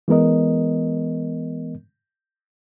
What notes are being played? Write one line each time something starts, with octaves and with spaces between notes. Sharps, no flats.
E3 G#3 B3 A#4 D#5